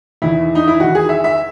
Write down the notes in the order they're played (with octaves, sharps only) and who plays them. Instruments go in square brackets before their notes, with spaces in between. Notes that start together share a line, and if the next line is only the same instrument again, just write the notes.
[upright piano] E2 D#3 E4
D#4
E4
E2 D#3 F#4
G#4
E5
E5